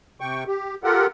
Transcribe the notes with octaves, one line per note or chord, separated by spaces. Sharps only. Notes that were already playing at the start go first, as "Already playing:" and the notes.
C3 G5 C#6
G4
F4 G4 A4 A#4 F#5